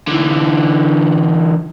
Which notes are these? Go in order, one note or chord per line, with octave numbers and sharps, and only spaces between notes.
D3 E3